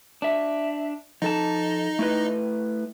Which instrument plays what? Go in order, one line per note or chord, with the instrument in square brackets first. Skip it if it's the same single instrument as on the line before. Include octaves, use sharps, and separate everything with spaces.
[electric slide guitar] D4 E5
[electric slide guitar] F3 A4 A5 [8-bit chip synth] D#4
[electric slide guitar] A3 E4 B4